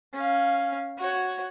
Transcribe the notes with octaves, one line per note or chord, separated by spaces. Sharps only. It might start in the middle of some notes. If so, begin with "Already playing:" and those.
C#4 F5
F#4 C#5